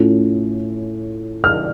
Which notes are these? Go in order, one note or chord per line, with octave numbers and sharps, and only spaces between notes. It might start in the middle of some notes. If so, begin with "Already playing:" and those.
Already playing: A2 A3 C#4 F4
F6